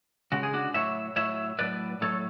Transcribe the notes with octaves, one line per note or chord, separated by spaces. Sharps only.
C#3 G#3 F#4
G#4
D4 F#4
A2 F#3 C#5 E5
A2 F#3 C#5 E5
A2 F#3 B4 D5
A2 F#3 A4 C#5